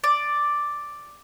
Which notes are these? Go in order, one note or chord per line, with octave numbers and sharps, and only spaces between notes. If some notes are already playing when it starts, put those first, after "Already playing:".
D5